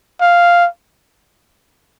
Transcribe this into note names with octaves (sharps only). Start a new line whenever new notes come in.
F5